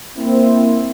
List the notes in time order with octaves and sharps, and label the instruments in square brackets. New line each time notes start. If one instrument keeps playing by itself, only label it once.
[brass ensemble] A#3 C4 E4